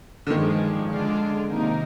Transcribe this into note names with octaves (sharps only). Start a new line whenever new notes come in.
D3
G2 D#3 F3 G#3 D4
D3 G#3 D4 F4
C3 D#3 A#3 D#4 A#4